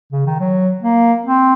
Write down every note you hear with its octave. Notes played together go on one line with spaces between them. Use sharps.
C#3
D#3
F#3
A#3
C4